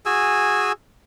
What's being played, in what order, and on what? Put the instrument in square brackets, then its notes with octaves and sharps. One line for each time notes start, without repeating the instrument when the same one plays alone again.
[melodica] F#4 G#4 G#5 E6